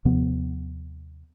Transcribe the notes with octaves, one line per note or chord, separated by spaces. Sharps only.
D#2 C3 F3 B3